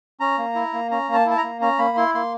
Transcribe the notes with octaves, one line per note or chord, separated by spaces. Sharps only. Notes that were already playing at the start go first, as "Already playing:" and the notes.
C#4 A#5
A#3
E4
A#3
C#4 A#5
A#3 A5
E4 A5
A#5
A#3
C#4 A#5
A#3 B5
E4 C6
A#3 C6